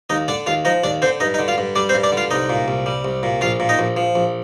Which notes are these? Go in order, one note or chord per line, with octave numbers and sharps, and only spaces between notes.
D#2 D#4 D#5
D3 D4 D5
D#2 F4 F5
F3 D#4 D#5
D#2 D4 D5
D3 C4 C5
G2 D#4 D#5
D#4 D#5
D3
F4 F5
G2
G3 D4 D5
C4 C5
G2
D4 D5
D3
F4 F5
C2 D#4 D#5
A#2
C2
G3
C2
A#2
A#1 F4 F5
A#2
D#4 D#5
A#1
F3
A#1